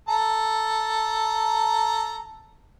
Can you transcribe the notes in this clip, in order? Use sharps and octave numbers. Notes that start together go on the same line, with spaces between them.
A4 A#5